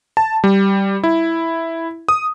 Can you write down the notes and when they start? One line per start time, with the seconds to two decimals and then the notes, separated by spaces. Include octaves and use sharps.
0.17 A5
0.44 G3
1.03 E4
2.09 D#6